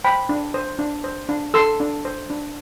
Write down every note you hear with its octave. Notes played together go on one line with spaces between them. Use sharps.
C5 G5 B5
D4
C5
D4
C5
D4
A4 C6 E6
D4
C5
D4